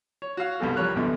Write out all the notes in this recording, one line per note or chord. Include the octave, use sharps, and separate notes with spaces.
C#5
F#4 C#5 F5
C2 G2 B2 A4
F3 G3 A#4 C#5 F#6
A#1 F#2 B2 D3 E3